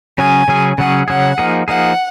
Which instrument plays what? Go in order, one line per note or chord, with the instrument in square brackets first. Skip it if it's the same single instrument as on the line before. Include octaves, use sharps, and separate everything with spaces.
[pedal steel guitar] C#3 F#3 C#4 G#4 [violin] G#5
[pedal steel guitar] C#3 F#3 C#4 G#4
[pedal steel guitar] C#3 F#3 C#4 G#4 [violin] F#5
[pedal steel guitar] C#3 F#3 C#4 G#4 [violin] F#5
[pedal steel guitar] F3 A#3 D#4 G#4
[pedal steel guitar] F3 A#3 D#4 G#4 [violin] F#5